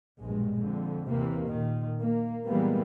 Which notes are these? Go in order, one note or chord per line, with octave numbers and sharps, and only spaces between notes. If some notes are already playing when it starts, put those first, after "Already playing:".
A#1 G2 B2 G#3
F2 D3
D#2 C3 E3 A#3
A#2 D#3
A#3
A#2 E3 G3 G#3 A#3 B3